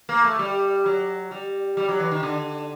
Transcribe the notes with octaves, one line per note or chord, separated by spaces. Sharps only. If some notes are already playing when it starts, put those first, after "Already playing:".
A#3
A3
G3
F#3
G3
G3
F#3
E3
D#3
D3